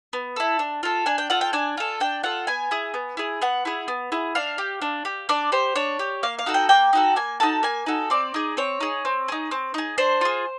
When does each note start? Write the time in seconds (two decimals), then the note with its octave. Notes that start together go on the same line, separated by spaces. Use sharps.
0.13 B3
0.36 E4 A4
0.59 D4
0.83 F4 A4
1.06 D4 G#5
1.18 G5
1.30 F4 A4 F#5
1.41 G5
1.53 D4 G#5
1.77 F4 A4
2.00 D4 G5
2.23 F4 A4 F#5
2.47 B3 G#5
2.71 E4 G#4
2.94 B3
3.17 E4 G#4
3.41 B3 F#5
3.65 E4 G#4
3.88 B3
4.12 E4 G#4
4.35 D4 F5
4.58 G4
4.82 D4
5.05 G4
5.29 D4 D5
5.52 G4 C5
5.75 D4 C#5
5.99 G4
6.23 A#3 F5
6.39 F5
6.46 D#4 F#4 A4
6.54 G5
6.69 A#3 G5
6.93 D#4 F#4 A4
7.16 A#3 G#5
7.40 D#4 F#4 A4 A5
7.63 A#3 G#5
7.86 D#4 F#4 A4
8.10 C4 D5
8.34 D#4 G#4
8.57 C4 C#5
8.80 D#4 G#4
9.05 C4
9.28 D#4 G#4
9.51 C4
9.74 D#4 G#4
9.98 D4 C5
10.21 F4 G#4